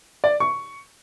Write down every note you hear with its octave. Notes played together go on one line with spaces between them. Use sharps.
D5
C#6